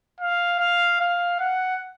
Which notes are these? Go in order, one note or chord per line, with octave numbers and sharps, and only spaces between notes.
F5
F5
F5
F#5